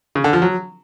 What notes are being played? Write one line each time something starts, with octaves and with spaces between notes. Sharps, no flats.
C#3
D3
F3
F#3